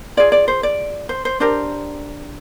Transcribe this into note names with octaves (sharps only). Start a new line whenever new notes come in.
F4 G#4 D5
D5
C5
D5
C5
C5
D4 G4 A#4 C5